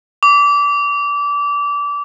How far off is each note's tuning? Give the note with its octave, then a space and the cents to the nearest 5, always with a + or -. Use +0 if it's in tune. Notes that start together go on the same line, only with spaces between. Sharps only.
D6 -25